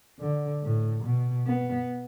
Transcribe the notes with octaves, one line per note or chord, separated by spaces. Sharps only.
D3
A2
B2
B3